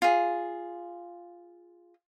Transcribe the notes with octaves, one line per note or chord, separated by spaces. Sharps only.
F4 G#4